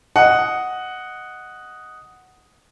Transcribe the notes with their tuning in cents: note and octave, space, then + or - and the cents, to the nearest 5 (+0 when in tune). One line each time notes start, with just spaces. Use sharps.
D#5 +0 F#5 +0